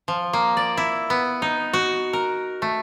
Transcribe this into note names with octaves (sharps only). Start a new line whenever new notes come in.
F3
A#3
D5
E4
B3
D#4
F#4
A#4
A3